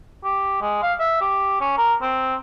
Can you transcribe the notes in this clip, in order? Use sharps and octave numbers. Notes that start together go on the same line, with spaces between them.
G4
G#3
F5
E5
G4
C#4
A#4
C4